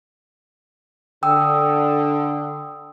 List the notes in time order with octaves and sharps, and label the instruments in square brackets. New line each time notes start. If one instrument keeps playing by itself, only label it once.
[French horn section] D3 [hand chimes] G5 D#6 E6